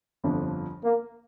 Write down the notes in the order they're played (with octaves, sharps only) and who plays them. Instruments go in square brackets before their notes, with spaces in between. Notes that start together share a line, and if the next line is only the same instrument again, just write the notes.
[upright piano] G1 F2 D3 F3 D4
[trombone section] A#3